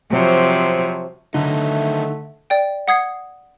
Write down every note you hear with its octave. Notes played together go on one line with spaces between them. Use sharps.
C3 F3 F#3
D3 D#3 F#3 A3 D#4
D5 G5
F#5 D#6 G#6 C7